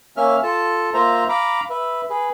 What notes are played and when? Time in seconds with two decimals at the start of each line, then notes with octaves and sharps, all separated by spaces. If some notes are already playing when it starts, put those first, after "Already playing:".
0.17 A#3 C#4 E5 F6
0.43 F4 A4 A5
0.94 A#3 F4 C5 E5 A#5
1.29 F5 A#5 B5 D6
1.70 B4 E5
2.10 G#4 B4